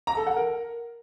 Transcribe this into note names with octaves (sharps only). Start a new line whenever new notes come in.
A#5
A4
F#5
A#4